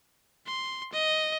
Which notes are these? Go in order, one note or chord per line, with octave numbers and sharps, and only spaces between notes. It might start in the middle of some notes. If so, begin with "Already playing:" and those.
C6
D#5